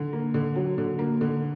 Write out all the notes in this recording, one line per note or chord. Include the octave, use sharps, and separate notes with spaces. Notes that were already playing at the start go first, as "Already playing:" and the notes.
Already playing: D3
A#3
D3
F#3
D3
A#3
D3